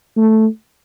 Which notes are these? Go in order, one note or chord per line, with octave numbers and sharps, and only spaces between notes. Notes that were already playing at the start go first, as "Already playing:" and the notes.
A3